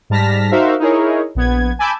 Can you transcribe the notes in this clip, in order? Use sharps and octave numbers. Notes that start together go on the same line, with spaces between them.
G#2 G3 A5 F6 A#6 B6
D#4 F#4 A#4 C5 E5 F5
D#4 E4 G#4 A#4 C#5
A#1 B3 G#6
G#5 A5 B5 D6 E6 G6